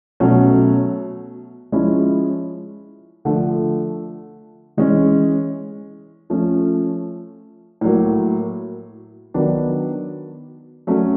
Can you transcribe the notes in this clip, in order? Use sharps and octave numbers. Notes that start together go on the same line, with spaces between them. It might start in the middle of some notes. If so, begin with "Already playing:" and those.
B2 F#3 A3 C#4
F3 G#3 C#4 E4
D3 F3 A3
E3 G#3 C#4
F3 A3 C#4
A2 F#3 A#3
D#3 F#3 B3 D4
F#3 A3 C#4